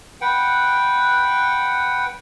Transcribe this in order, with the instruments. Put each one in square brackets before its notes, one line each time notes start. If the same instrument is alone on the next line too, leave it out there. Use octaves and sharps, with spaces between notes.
[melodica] B4 F#5 G5